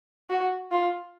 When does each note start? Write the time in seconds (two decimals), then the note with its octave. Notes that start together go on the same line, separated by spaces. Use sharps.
0.30 F#4
0.71 F4